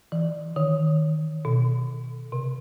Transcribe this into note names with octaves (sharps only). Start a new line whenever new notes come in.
E3
D#3
B2
C3